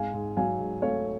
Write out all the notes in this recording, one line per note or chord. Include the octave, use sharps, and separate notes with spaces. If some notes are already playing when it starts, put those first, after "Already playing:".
Already playing: G#2 F5 G#5
G#2
F#3 F5 G#5
G#2
A3 C#5 F5